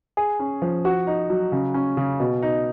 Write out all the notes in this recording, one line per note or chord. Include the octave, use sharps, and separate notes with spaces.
G#4
C#4
F3
F#4
D#4
F#3
C#3
C#4
C#3
B2
D#4